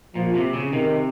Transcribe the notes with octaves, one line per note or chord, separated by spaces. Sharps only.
A#2 F3
C3
C#3
C3 D#3